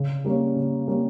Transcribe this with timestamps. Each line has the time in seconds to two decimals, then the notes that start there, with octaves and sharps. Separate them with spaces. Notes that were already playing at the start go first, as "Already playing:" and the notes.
Already playing: C#3
0.24 G3 A#3 C#4
0.56 C#3
0.88 G3 A#3 C#4